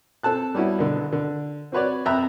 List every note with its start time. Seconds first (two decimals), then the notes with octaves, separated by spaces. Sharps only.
0.23 C4 A4 A5 F#6
0.55 G3 B3 C#4 E4 F#4
0.78 B1 D3
1.12 D3
1.72 C4 F#4 B4 C#5 D5
2.05 F2 E5 G5 A#5 B5 F#6